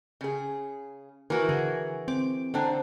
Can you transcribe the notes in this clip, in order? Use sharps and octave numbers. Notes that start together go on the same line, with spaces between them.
C#3 G#4
E3 F#4 A#4
D3 G#4
C4 D6
D3 C4 D4 A#5